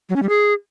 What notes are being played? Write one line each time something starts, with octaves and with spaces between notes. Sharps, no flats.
F#3
C#4
G3
G#4